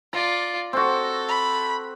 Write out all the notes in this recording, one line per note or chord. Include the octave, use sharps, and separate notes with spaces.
F4 D5 A#5
C4 F#4 A4
B5